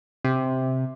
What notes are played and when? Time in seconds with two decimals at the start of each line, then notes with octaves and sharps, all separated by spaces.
0.25 C3